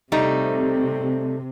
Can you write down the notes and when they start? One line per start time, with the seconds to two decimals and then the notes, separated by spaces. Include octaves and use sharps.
0.12 C3 G3 A3 D#4